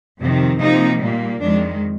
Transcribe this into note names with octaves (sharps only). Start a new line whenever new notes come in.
F2 C3 D#3
C3 F3 A#3 D#4
A#2 G3 A#3
F2 D#3 G#3 D4